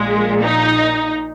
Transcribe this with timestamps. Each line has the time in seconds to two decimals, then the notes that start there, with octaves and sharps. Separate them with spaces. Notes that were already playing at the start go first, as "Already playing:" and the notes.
Already playing: A#1 A#2 G#3
0.41 D#4